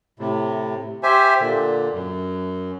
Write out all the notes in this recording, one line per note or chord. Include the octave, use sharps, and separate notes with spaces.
A2 C3
G4 C5 E5 G#5
A#2 D3
F#2